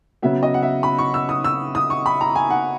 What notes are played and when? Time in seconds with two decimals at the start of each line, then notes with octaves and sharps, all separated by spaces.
0.22 C#3 F#3 B3 E5
0.43 D#5
0.54 F#5
0.62 E5
0.83 B5
0.98 C#6
1.14 E6
1.29 D#6
1.44 E6
1.75 D#6
1.90 C#6
2.06 B5
2.21 A#5
2.35 G#5
2.50 F#5